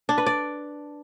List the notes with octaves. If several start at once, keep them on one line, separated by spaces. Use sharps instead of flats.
D4
B4
D5